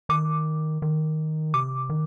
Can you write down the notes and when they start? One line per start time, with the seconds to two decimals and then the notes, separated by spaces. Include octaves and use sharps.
0.09 D#3 D6
0.82 D#3
1.54 C3 D6
1.89 D#3